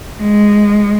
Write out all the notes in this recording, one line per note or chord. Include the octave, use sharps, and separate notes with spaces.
G#3